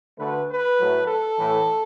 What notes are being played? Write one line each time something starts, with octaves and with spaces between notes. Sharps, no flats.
D2 D3 A3 B4
B4
A2 F#3 A3
A4
A2 E3 A3